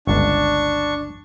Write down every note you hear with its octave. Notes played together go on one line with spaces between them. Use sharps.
G1 C#2 D4 C#6